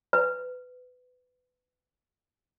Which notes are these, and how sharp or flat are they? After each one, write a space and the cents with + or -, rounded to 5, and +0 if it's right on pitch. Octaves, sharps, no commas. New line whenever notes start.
B4 +20